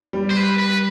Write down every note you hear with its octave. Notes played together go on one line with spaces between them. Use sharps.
G3
C5
B4
B4